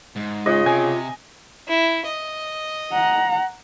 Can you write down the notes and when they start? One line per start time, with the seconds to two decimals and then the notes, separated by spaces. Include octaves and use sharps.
0.16 G#2
0.46 C#3 F4 D#5
0.66 C3 G#5
1.68 E4
2.05 D#5
2.93 F#5 A#5